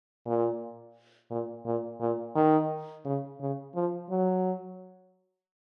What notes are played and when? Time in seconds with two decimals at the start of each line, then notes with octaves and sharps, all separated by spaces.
0.26 A#2
1.31 A#2
1.65 A#2
2.01 A#2
2.36 D#3
3.05 C#3
3.40 C#3
3.75 F3
4.10 F#3